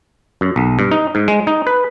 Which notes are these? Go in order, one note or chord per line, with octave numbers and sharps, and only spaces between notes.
F#2
B1
G2
D#4
G#2
G#3
D#4
B4